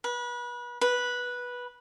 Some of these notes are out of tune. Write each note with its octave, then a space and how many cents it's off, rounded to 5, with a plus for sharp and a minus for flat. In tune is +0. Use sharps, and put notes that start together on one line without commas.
B4 -30
B4 -10